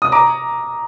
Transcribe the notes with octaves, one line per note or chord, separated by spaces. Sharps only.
D#6
A#5 D6